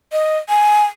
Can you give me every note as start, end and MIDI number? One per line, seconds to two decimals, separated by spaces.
0.12 0.37 75
0.49 0.84 80